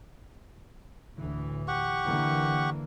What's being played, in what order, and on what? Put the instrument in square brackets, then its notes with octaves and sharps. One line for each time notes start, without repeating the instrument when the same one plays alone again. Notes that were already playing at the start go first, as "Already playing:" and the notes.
[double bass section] D2 A2 E3
[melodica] G4 F#5 C#6
[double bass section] D3 E3 A#3